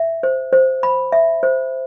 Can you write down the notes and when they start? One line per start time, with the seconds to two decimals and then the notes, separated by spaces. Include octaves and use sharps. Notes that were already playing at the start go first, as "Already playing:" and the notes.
Already playing: E5
0.23 C5
0.53 C5
0.83 B5
1.12 E5
1.43 C5